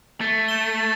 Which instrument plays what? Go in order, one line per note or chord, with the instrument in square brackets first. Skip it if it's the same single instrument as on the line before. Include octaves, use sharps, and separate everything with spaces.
[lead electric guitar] A3 [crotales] A6
[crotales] E7 G7
A6